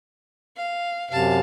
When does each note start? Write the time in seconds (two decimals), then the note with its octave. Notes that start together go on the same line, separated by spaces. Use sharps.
0.57 F5
1.11 F#2 C3 F5 A5